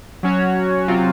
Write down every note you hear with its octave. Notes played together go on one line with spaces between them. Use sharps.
F#3 C#4 F#4 C#5
C3 F#3 C4 F4